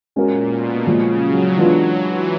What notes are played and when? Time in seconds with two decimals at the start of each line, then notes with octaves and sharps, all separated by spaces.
0.16 A#2 G#3 C#4 F#4 A#4
0.51 B2
0.86 A#2 C#3 F3 G#3
1.22 F#3
1.57 E3 F#3 G#3 B3 D4 F4
1.92 E3